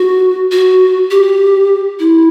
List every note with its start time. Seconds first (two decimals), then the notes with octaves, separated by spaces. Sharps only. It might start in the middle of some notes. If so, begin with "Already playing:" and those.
Already playing: F#4
0.52 F#4
1.11 G4
1.99 E4